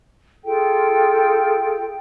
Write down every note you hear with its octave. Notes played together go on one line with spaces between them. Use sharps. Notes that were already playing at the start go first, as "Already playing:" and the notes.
F4 G#4 A4 G5